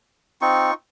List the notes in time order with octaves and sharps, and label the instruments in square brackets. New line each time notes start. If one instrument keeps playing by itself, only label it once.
[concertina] C4 [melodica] D#4 F4 C#6